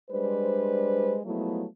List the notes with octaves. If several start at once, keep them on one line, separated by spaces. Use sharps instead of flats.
G3 G#3 D4 B4 C5
F3 F#3 G#3 A3 B3 E4